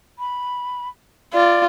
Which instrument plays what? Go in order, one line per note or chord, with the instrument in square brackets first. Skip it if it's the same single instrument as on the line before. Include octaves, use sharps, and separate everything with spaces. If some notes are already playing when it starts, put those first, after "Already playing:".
[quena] B5
[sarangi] F4 [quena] D5